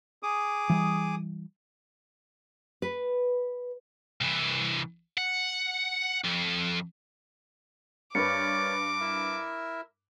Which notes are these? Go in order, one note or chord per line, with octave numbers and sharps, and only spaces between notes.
G#4 D6 D#6
E3 G3
B4
C2 E3
F#5
F2
G2 A#4 B4 C#5 D5 D6 C#7
E4 A#4 E5